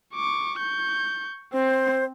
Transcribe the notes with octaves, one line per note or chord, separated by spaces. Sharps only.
C#6 D6
C#6 G6
C4 C5